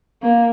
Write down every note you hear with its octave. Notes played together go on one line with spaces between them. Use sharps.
A#3